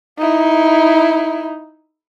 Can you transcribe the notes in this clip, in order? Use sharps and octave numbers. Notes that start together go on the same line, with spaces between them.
D#4 E4